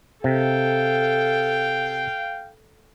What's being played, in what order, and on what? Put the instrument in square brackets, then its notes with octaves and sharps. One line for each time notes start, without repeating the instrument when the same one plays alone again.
[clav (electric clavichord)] C3 [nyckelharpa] A4 [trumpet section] F5 G5